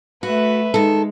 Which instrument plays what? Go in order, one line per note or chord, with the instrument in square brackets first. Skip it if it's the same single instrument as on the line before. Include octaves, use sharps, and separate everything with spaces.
[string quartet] A3 B4 E5 [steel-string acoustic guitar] F#4
[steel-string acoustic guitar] D#3 A4 [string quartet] G#3